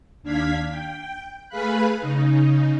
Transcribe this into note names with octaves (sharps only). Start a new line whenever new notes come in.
D#2 D4 F5 G#6 B6
G5
A3 G#4 B4 F5 B5 F#6
C#3 D#4